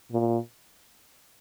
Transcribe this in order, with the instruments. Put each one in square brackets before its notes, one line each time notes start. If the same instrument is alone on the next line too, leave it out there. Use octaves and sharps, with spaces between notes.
[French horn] A#2